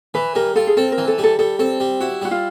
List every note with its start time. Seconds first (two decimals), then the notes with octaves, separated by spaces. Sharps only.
0.14 E3 B4
0.35 G3 A#4
0.56 F4 A4
0.67 G#4
0.77 C4 A4
0.92 A#4
0.98 E3
1.08 A4
1.18 G3
1.24 A4
1.39 G3 A4
1.59 C4 A4
1.80 G3
2.00 E4 F#4
2.22 G3 F#4
2.31 F4